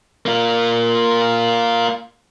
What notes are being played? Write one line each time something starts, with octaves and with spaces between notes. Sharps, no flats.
A#3 F4